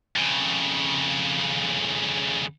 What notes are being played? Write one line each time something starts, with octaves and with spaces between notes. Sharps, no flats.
F2 C#3